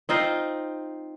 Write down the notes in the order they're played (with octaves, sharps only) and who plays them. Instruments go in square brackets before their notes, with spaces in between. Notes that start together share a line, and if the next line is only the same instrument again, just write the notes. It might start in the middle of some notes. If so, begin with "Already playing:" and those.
[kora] C4 D#4 F4 C5